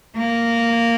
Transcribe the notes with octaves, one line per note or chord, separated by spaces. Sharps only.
A#3